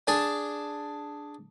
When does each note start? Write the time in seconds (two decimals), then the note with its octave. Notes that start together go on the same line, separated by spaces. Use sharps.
0.07 D4 G#4 A5